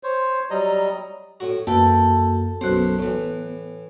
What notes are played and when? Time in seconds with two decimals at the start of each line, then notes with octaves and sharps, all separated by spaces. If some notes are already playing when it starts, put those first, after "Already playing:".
0.03 C5 C#5
0.51 F#3 G3 D#5 A#5
1.40 A2 F#4
1.67 F#2 A#3 F#4 A4 B4 G5
2.61 B1 F#2 B3 C5 F#6
2.99 A2 E3